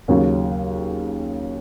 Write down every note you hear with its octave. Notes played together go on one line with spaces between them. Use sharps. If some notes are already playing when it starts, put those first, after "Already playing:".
D#2 C#3 F#3 C#4 F#4